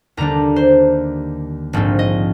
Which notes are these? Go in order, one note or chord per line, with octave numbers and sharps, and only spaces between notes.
D#2 D3 G3 D4 A#5
C5
A#1 G#2 F3 C4 D#4
D#5